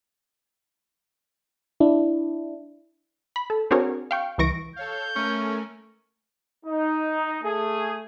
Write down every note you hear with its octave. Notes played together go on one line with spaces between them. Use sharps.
D4 E4
B5
A4
C4 D4 F#4 G#4 A#4 C#5
F5 G5 C#6
C#2 E3 C#6 A#6 D7
A4 C#5 F5 G6
A3 C#4 A#4 G#5
D#4
A3 G#4